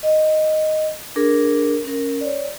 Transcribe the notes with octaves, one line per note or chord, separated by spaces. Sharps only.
D#5
D4 G#4 A#4
C#4 A#4
C#5 D5